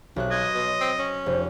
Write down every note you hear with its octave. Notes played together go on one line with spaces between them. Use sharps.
B1 C3 F#6
D#5 C6 F#6 G#6
B2
C4
C#4
F1 C5